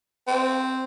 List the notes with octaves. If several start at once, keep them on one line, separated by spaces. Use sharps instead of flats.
C4